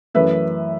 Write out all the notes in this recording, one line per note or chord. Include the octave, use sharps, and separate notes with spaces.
F#2 E3 A3 B4 E5